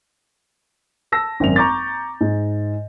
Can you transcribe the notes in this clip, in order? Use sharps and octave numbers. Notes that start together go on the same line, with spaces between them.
A5 E6 A#6
G#1 F#2 F7
A#5 C#6 D6 G6 A6
G#2